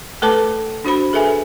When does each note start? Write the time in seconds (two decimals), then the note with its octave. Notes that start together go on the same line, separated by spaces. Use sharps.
0.22 A3 A4 B4 A5 D6
0.84 D4 F#4 C5 B5
1.13 G#4 A4 B4 E5 G#5